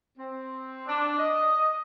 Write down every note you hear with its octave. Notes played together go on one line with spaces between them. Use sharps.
C4
D4
D#5